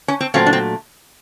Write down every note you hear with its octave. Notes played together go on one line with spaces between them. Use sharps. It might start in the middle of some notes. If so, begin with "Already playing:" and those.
C#4
C4
A#2 F#3 A3 C4 C#4
D4
C4